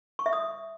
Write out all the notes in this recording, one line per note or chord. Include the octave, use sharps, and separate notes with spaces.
C#6
E5
D#6